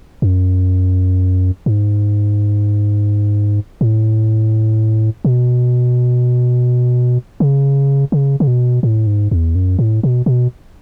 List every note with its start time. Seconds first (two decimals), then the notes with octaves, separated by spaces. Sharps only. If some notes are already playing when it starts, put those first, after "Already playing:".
0.22 F#2
1.66 G#2
3.81 A2
5.25 B2
7.40 C#3
8.12 C#3
8.40 C#3
8.47 B2
8.83 A2
9.07 G#2
9.31 E2
9.55 F#2
9.79 A2
10.03 B2
10.26 B2